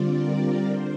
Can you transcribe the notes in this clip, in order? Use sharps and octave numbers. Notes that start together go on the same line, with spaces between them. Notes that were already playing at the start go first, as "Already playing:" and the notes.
Already playing: D3 G3 C4 F4 D5
A#4
D3 C5